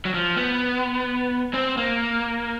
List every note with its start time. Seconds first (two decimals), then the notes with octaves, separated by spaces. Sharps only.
0.05 F#3
0.14 F3
0.37 B3
1.54 C4
1.77 A#3